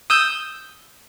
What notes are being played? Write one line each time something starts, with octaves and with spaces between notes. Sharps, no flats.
D#6 E6 G6